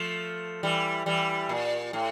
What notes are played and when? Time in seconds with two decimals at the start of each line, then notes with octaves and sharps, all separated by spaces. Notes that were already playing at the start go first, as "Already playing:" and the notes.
Already playing: F3 A3
0.63 E3 G3
1.06 E3 G3
1.49 A#2
1.93 A2